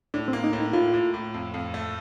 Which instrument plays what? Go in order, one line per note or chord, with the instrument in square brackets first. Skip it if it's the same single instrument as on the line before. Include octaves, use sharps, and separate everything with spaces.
[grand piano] A2 [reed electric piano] D4
[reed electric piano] C4
[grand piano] A#3
[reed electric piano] D#4
[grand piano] A2
[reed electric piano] D#4
[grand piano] A2 [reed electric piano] F4
[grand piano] A2
A2
F2
F2
A3